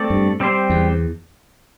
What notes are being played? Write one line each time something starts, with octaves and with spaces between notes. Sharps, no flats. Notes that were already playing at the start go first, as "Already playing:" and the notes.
Already playing: A3 C4 A4 D5
G2
G3 C4 G4 C5
E2